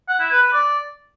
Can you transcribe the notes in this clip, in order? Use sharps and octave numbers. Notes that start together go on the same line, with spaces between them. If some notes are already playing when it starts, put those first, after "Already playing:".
F#5
E4
B4
B4
D5